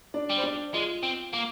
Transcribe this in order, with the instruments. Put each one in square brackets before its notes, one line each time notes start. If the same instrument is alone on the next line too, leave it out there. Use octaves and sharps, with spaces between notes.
[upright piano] D4 D5
[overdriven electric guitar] G3
[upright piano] C5
D4 D5
[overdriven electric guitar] G#3 [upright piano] F4
[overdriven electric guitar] C4
A#3